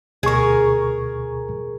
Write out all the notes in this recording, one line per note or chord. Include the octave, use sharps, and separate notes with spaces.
D2 B2 G#4 A#4 C#6